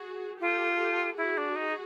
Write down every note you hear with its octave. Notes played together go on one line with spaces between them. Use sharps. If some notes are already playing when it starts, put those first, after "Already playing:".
Already playing: F#4 G#4
F4 G4 A4
G4 A4
E4 F#4 G#4
D4
D#4